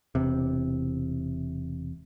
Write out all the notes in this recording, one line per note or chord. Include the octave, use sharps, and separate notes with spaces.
E1 C3